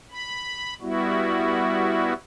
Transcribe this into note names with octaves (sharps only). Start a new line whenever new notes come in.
B5
G3 B3 E4 F#4